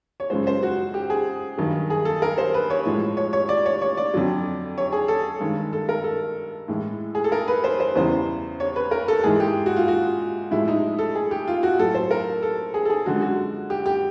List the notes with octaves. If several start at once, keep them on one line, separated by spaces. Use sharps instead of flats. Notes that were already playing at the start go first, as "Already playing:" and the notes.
C#5
F#2 C#3 F3 G#3 C5
C5
F#4
G4
G#4
G2 D#3 F#3
G#4
A4
A#4
C5
B4
C#5
A2 F3 G#3
C#5
C#5
D5
C#5
C#5
D5
F2 D3 F#3
C#5
G#4
A4
G2 D#3 G#3
A4
A#4
A4
A2 E3 G#3
G#4
A4
A#4
B4
C5
C5
E2 C#3 E3 G3 C5
C#5
B4
A#4
A4
G#2 E3 G#3 G#4
G4
F#4
F4
F#4
A2 F3 G#3 E4
D#4
A4
G#4
G4
F4
F#4
A2 F#3 A4
C5
A#4
A4
G#4
A4
G#4
F#2 D3 F3 G#3 F#4
F#4
G4
G4